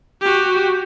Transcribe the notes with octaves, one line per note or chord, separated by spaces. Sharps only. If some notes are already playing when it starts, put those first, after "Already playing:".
F#4 G4